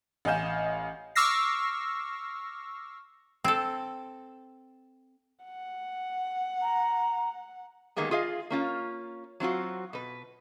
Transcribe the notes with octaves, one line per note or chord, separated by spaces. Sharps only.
A1 D#5 F5 G#5 G6 E7
C#6 D6 E6 F6 A#6 C7
C4 A4
F#5
A#5
D#3 G3 G#3 A#3 B3
F4 G#4 D#5 F5
A#3 C#4 F4
F#3 C4 F4 F#4
B2 B4